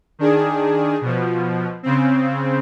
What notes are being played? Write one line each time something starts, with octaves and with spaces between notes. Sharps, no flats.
D#3 D4 G#4
B2 F3
C#3 C4